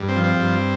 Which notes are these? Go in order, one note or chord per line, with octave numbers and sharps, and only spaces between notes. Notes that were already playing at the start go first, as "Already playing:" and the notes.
Already playing: G2
C4
F3
C4
G2